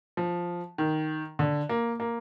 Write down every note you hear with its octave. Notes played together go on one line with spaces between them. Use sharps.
F3
D#3
D3
A#3
A#3